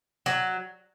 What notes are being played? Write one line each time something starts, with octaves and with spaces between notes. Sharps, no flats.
F#3